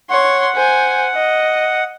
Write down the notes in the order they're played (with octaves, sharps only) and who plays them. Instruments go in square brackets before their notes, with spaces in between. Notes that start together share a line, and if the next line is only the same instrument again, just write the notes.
[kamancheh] C#5 C6 [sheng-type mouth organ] F#5
[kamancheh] C5 G#5
D#5